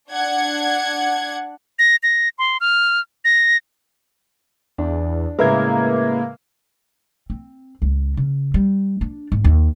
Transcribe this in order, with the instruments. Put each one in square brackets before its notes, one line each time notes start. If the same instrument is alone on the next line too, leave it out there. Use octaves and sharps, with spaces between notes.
[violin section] D4 F#5 G#6
[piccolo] A#6
A#6
C6
F6
A#6
[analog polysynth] E2 [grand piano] D4
[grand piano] A2 C#3 G#3 [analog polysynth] A#3 [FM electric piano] B4 E5 G#6
[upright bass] C4
C#2
C#3
G3
D4
G#1
D#2